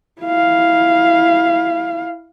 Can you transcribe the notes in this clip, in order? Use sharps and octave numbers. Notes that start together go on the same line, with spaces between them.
E4 F5